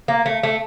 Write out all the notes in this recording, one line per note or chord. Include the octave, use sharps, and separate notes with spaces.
A#3
A3
A3